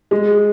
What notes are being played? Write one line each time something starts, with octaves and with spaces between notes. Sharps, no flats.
G#3